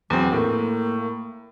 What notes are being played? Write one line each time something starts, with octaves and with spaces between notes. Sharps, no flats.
E2 F#3 C4
A2 A#3